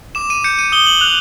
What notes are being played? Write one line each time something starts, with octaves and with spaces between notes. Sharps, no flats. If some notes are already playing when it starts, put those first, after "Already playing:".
D6 E7
D#7
G6 C#7
D#7
D#6 G7
F#7
F#6 F7